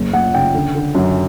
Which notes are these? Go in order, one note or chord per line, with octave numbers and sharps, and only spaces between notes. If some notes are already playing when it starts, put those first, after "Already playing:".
Already playing: F#1
F#1 F#5
C#3 G5
D3
D3
F#2